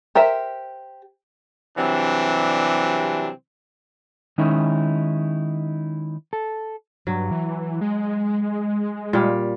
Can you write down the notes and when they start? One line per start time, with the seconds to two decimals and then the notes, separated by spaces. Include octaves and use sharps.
0.15 G4 A#4 C5 E5
1.77 C3 E3 F#3 G3 C4 D4
4.38 D#3 G#3 C#4 D#4 E4
6.33 A4
7.07 G2 F#3
7.31 E3
7.81 G#3
9.13 A#2 G3 F5